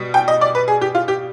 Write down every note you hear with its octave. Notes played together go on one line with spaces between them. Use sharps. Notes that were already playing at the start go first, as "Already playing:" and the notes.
Already playing: B2 G3
G5
D#5
D5
B4
G#4
G4
F4
G4